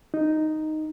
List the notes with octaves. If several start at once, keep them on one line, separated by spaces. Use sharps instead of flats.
D#4